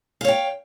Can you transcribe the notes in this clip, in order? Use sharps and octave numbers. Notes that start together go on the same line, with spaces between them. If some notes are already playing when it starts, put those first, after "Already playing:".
C#5 F5 G5